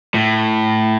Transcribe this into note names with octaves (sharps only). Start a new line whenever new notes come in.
A2